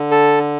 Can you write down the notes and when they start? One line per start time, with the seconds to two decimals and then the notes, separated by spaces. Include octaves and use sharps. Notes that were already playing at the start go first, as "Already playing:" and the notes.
Already playing: D3
0.11 A4